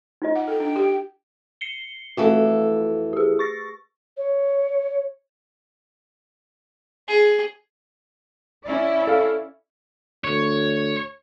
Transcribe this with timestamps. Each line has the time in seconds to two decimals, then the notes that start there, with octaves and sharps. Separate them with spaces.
0.22 D#4 F4 D#5
0.36 F#5
0.48 A4 G5
0.60 D4
0.76 G4
1.61 C7 C#7 G7
2.17 F2 E3 A3 F4 F#4 A4
3.13 G4 G#4
3.39 C#6 A6 A#6
4.17 C#5
7.08 G#4
8.64 C#4 E4 D5
9.07 A4 F5
10.24 D2 C#5